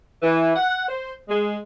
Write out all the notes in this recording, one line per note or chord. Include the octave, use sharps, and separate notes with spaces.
E3
F#5
C5
G#3